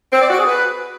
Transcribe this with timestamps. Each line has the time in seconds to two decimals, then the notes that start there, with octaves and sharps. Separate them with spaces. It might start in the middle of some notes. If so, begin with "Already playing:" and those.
0.13 C4
0.22 D5
0.30 F#4
0.39 G#4
0.47 B4